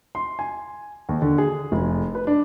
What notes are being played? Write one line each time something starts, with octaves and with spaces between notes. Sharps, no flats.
C6
G#5
D#2
D3
G#4
F1
B4
D4